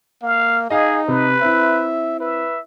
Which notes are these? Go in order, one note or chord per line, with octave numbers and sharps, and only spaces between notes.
A#3 F5
D#4 G#4 D#5 F5
C3 B4
C4 E4 E5
B4 E5